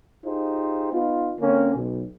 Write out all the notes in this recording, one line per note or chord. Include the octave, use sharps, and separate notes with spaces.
D#4 F4 G4 G#4 C5
B3 D#4 F4
D3 A#3 C4 C#4
B1